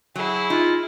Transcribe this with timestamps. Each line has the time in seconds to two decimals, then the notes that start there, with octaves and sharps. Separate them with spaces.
0.16 F#3 E4 G#4
0.50 D#4 F4